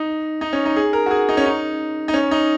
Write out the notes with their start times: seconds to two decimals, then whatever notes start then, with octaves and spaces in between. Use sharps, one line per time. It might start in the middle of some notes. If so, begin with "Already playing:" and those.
Already playing: D#4
0.41 D#4
0.53 C#4
0.65 D#4
0.76 G#4
0.93 A#4
1.06 F#4
1.11 G#4
1.29 D#4
1.37 C#4
1.46 D#4
2.08 D#4
2.14 C#4
2.31 D#4